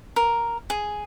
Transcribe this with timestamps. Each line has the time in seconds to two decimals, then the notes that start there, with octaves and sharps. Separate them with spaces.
0.16 A#4
0.70 G#4